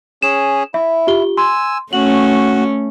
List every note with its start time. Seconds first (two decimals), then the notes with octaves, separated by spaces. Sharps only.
0.22 C#4 G#4 E7
0.74 E4 E5
1.07 F4 G4 G7
1.38 G#5 C6 E6
1.93 A3 C#4 F#4 F#7